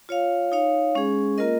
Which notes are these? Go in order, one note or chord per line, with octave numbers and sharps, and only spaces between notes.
F4 C#5 F5
D#4 C#5 F5
G#3 C#4 G#4
A#3 F4 A#4 D#5